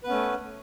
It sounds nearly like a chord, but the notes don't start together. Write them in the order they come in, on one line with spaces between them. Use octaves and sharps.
B4 B3 C#4 A3